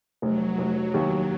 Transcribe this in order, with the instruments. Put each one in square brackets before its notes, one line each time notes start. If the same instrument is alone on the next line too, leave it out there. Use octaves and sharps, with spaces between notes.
[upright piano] F1 [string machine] F#3
[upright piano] F1
D#2